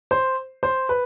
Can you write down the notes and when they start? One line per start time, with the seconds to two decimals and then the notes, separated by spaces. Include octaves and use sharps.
0.11 C5
0.63 C5
0.89 B4